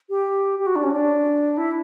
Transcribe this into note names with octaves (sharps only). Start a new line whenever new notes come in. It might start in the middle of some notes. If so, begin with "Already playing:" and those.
G4
G4
F#4
D4
C#4
D4
E4